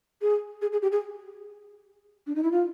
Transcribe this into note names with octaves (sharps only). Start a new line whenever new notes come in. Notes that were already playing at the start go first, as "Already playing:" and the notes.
G#4
G#4
G#4
G4
G#4
D4
D#4
E4
F4